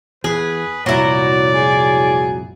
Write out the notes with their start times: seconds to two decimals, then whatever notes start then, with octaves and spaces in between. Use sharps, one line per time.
0.24 E2 G#4 B4
0.86 F1 C2 A#2 F#3 E4 D5
1.55 G#4